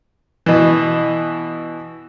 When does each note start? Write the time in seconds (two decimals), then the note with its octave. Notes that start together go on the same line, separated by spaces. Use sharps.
0.46 B2 E3